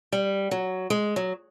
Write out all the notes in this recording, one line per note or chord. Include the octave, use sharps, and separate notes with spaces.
G3
F#3
G#3
F#3